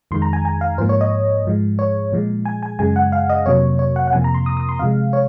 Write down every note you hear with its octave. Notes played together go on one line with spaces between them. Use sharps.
F2 D#3 G#3 C6
A#5
G#5
G#5
F5
G#2 F3 A#3 C5
C#5
D#5
G#2 F3 G#3
C#5
A#2 F3 G#3
G#5
G#5
F#2 C#3 G#3 G#5
F#5
F5
D#5
F2 C3 F#3 A#3 C#5
C#5
F#5
F#5
F2 C3 F3 A#3 G#5
A#5
C6
D#6
D#6
C6
C3 F3 G#3 F5
C#5